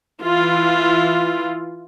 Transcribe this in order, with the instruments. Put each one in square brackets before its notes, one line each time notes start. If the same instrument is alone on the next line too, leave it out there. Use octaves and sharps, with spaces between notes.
[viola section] E3 E4 F4